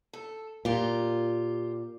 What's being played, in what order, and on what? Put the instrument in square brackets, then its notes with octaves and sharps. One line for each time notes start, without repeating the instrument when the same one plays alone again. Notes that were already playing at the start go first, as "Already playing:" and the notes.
[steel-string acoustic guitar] A4
[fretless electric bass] A#2 [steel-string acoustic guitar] F4 G4